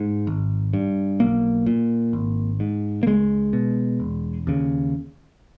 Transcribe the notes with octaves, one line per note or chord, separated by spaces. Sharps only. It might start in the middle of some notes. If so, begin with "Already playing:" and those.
Already playing: G#2
G#1
G2
B1 A#3
A#2
G#1
G#2
A#3
C#2 G#3
B2
E1
D#2 C#3